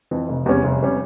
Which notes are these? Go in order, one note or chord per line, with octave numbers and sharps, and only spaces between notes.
F2 E3
F1
E2 C3 G3 C#4
F1
C3 G3 C#4